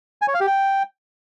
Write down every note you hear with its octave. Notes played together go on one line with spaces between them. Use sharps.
G#5
C#5
F5
G4
G5